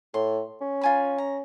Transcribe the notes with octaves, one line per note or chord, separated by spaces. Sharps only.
A2 C6
C#4
F4 G#5 B5
A#5